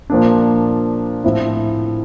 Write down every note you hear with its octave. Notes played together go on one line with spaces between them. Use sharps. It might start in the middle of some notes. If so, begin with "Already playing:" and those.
A#2 F3 A#3 D4
A2 F3 C4 E4